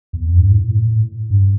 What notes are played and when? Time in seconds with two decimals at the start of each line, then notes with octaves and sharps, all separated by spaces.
0.13 E2
0.25 F2
0.37 G2
0.50 A2
0.70 A2
1.30 G2